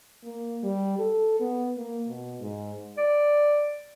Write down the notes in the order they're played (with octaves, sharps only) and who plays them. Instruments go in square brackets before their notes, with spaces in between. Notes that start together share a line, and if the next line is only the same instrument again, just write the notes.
[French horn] A#3
G3
A4
B3
A#3
B2
G#2
[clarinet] D5